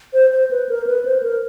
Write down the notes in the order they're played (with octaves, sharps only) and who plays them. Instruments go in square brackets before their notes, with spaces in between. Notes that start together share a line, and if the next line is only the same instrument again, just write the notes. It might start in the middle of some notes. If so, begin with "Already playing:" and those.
[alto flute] C5
C5
B4
A#4
B4
C5
A#4